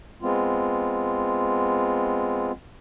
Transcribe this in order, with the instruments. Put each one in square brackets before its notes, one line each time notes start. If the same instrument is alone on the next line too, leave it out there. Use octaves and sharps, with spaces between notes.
[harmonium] G#3 B3 C4 F4